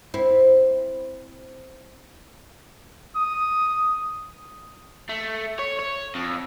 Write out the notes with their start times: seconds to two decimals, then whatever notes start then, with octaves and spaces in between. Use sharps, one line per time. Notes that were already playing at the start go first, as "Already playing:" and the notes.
0.14 C4 E4
3.15 D#6
5.09 A3
5.59 C#5
5.79 C#5
6.15 F2